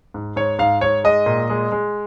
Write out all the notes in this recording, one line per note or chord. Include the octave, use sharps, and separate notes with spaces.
G#2
G#2 C#5
G#2 F5
G#2 C#5
G#3 D#5
A#2
G#3
G#3